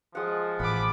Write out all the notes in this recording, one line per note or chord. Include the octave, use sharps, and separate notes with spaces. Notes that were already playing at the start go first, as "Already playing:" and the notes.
F3 G#3 F#5
A1 F#5 B5 D6